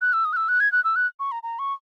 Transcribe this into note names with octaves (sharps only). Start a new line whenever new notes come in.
F#6
E6
D#6
F#6
E6
F#6
G#6
F#6
E6
F#6
C#6
A#5
A#5
C#6